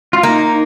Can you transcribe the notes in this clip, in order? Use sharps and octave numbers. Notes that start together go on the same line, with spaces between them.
F4
A#3 D#4